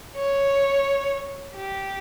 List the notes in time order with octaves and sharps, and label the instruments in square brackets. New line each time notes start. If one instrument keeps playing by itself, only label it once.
[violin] C#5
G4